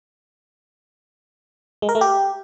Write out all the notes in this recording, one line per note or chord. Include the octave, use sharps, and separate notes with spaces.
G#3
A#4
A3
G4